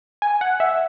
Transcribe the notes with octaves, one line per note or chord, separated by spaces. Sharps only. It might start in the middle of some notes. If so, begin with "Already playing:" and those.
G#5
F#5
E5